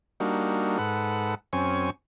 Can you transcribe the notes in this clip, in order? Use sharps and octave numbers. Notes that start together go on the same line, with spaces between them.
G3 A#3 D4 D#4 F#4
G#2 A4 B4 F#5
F#2 C4 C#4 G#5 C#6